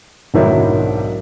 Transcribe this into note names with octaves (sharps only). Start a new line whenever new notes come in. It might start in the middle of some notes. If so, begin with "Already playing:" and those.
B1 G#2 D#3 F#3 D4 E4